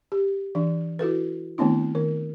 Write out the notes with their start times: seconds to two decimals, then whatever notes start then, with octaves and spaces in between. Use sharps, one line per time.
0.12 G4
0.55 E3 D4
0.99 E4 F#4 A4 B4
1.58 D#3 A3 B3 C4 D4 E4
1.95 D#3 A#4